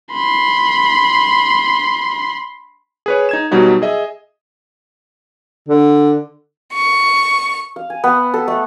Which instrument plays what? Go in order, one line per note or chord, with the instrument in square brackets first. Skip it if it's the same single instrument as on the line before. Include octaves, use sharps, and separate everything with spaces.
[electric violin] B5 C6
[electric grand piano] G#4 B4 C#5
D#4 G#6 E7
B2 F#3 G3 D#4 F#4
G#4 D#5 E5
[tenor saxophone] D3
[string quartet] C#6
[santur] F5
G#5
B3
A4
A3